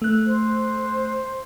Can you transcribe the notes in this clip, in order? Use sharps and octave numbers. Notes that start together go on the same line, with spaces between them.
A3 F#6
C5